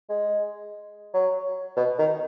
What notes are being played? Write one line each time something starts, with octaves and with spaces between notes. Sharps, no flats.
G#3
F#3
B2
D#3